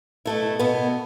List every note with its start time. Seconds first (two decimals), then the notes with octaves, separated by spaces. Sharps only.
0.26 B2 A3 E4
0.59 B2 B3 E4